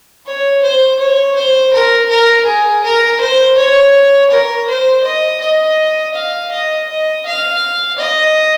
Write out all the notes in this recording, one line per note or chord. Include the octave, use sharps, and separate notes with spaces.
C#5
C5
C#5
C5
A#4
A#4
G#4
A#4
C5
C#5
A#4
C5
D#5
D#5
F5
D#5
D#5
F5
D#5